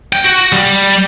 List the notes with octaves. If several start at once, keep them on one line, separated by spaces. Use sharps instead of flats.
G5
F#4
G3